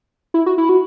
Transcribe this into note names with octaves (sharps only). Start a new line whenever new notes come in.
E4
F#4
E4
F#4